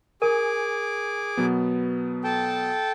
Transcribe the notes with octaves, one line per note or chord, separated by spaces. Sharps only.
G#4 A#4 G#5 D6
B2 F#3 B3
A4 G5 A5